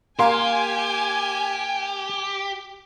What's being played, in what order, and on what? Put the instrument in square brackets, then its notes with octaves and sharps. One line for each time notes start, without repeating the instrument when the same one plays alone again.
[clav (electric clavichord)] A#3 [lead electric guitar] G4 [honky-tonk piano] F5 C6 [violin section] G#5